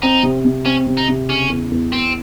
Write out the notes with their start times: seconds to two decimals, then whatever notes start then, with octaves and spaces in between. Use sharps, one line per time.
0.03 C4 D#4
0.23 C3
0.45 C3
0.66 C4 C#4
0.87 C3
0.97 D#4
1.08 C3
1.29 C#3 C#4
1.50 E2
1.71 E2
1.92 E2 C4